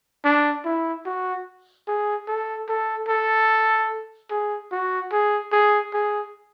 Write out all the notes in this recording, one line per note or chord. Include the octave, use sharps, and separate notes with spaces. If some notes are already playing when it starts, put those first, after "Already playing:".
D4
E4
F#4
G#4
A4
A4
A4
G#4
F#4
G#4
G#4
G#4